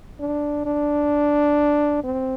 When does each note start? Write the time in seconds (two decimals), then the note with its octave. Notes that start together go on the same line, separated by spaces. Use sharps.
0.20 D4
0.66 D4
2.04 C4